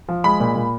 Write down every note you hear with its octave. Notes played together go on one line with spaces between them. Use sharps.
F3
G#3 B5
A#2
A#2